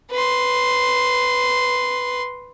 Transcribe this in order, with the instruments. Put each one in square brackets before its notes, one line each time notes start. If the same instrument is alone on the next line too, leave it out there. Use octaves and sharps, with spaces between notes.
[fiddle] B4 C6